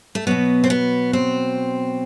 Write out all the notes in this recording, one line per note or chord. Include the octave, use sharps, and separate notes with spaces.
A3
B2 F#3 B3
C4
B3
C4